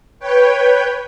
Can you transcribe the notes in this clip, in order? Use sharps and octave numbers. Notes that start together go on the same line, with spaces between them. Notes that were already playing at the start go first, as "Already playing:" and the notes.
B4 C#5 G5